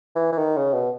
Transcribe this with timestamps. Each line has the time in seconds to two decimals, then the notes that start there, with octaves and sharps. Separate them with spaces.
0.15 E3
0.32 E3
0.38 D#3
0.57 C#3
0.74 B2